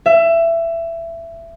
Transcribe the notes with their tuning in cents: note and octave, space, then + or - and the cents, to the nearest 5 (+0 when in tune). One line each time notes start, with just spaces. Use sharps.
E5 +20